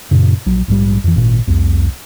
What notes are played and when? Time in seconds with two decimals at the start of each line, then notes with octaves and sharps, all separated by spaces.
0.11 F#2 A#2 C#3
0.46 A#1 F#3
0.68 A#1 G#2 C#3 G3
1.04 F2 E3
1.16 G#1 A#2
1.47 C2 F2